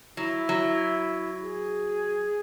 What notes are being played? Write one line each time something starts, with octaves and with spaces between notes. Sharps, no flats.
F#3 E4
F#3
G#4